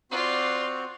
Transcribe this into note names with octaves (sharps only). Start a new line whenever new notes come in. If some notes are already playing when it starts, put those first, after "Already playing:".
C4 F4 F#4 D5